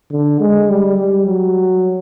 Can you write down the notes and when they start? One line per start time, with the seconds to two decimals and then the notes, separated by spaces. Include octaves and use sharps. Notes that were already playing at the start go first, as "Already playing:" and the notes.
0.11 D3
0.41 G#3
0.69 G3
0.98 G3
1.27 F#3